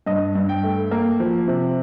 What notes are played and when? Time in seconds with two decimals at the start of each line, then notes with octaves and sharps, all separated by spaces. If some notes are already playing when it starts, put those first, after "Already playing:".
0.06 G2 D#5
0.35 G2
0.49 G5
0.63 A3
0.91 A#3
1.20 F3
1.48 C3